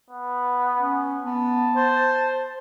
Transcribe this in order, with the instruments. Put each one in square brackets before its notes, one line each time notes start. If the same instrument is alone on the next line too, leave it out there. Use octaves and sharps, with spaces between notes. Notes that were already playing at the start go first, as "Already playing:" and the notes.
[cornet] B3
[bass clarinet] C#4
[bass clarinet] B3 [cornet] A5
[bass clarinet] C5